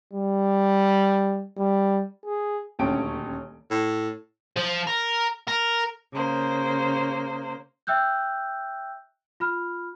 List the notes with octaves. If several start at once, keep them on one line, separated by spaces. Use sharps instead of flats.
G3
G3
G#4
D#1 D2 C#4 G5 D7
A2
F3
A#4
A#4
C#3 A#3 C5
E5 G5 E6 F#6 G6
F4 B5 F6